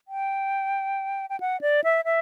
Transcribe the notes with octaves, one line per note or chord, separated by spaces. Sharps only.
G5
G5
F#5
D5
E5
E5